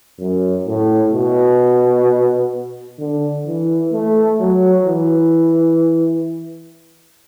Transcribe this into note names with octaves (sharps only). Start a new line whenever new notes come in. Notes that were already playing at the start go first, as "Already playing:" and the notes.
F#2
A2
B2
D3
E3
A3
F#3
E3